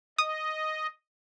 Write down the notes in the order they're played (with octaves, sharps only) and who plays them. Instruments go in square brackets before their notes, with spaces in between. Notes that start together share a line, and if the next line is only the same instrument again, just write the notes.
[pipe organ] D#5 [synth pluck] D#6